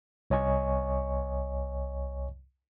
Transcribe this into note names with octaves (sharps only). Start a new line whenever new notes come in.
C2 C#5 D#5 G#5 C#6